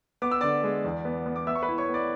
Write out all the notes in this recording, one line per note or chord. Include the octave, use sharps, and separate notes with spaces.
B3 D6
E6
D3 D5 D6
G#3
E2
B3
B3
D6
B3 E5 E6
C#6
B4 B5
E4
C#5 C#6
B3 D5 D6